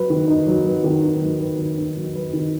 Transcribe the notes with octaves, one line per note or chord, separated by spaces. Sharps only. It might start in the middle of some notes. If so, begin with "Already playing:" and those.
Already playing: F#3 B4
D#3
D#4
F#3
B4
D#3
D#4
F#3
B4
D#3
D#4
F#3
B4
D#3